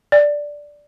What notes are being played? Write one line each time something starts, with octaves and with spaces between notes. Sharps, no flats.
D5